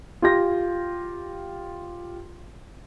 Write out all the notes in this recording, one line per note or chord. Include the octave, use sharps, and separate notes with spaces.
F4 G4 G6 A#6